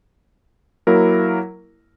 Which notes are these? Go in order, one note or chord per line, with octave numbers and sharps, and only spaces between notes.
F#3 A#3 E4 A#4